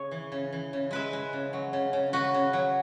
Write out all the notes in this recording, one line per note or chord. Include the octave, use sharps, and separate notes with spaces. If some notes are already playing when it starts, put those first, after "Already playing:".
Already playing: C#3 G#4 C#5
E3
C#3
E3
C#3
G#3 B4 E5
G#3
C#3
F#3
C#3
C#3
C#3 F#4 B4
C#3
F#3